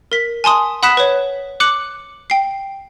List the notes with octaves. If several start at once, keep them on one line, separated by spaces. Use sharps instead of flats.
A#4 B6
G#5 A5 C6 D#6
F#5 B5 D#6 F#6 B6 E7
B4 C#5
D6 F#6 C#7 F#7
G5 C7